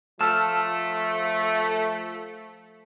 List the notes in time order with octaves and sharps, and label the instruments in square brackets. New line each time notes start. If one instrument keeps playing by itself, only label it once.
[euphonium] F3 [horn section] A3 [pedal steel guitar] A5 E6 F6